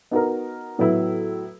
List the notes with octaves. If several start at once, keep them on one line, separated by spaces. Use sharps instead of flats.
B3 D#4 F#4 A#4
A2 F#3 B3 E4